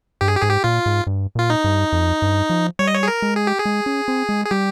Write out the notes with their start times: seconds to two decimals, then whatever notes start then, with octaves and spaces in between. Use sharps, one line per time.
0.21 G2 G4
0.28 G#4
0.36 G4
0.42 G#2 G#4
0.49 G4
0.64 A#2 F4
0.86 G#2
1.07 G2
1.35 A#2 F4
1.50 D#4
1.64 G2
1.92 F2
2.22 G2
2.50 F3
2.79 G3 C#5
2.87 D#5
2.95 C#5
3.03 G#4
3.08 A#4
3.22 G#3
3.36 G#4
3.47 G4
3.59 G#4
3.65 G#3
3.86 C#4
4.08 C4
4.29 G#3
4.46 G#4
4.51 G3 G4